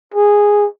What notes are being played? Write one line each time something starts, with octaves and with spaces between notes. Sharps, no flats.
G#4